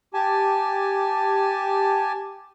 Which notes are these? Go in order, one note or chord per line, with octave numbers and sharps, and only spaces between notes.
G4 G#5 A5